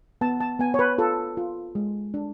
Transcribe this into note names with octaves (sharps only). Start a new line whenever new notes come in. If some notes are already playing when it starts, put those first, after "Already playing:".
B3 A5
A5
B3 G#5
C#5
B4
F4 A4
F4
G#3
D4